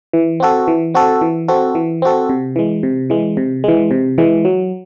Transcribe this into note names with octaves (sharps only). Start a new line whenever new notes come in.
E3
C4 F#4 A4
E3
C4 F#4 A4
E3
C4 F#4 A4
E3
C4 F#4 A4
C3
E3 G#3
C3
E3 G#3
C3
E3 G#3
C3
E3 G#3
F#3